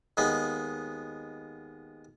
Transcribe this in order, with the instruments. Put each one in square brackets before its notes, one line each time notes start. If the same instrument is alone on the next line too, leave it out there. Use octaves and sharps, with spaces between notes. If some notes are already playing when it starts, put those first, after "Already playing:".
[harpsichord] D#2 G#3 B3